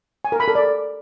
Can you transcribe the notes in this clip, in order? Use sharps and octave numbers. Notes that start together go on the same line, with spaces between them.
G#5
A#4
B5
A4
D5